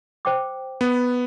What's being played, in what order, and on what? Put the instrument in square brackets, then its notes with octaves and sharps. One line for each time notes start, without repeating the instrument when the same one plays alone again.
[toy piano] C5 G5 D6
[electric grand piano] B3